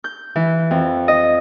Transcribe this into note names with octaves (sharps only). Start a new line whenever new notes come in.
G6
E3
F2
D#5